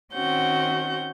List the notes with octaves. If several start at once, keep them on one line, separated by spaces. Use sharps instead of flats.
D#3 C4 C#4 F#4 F#5 G6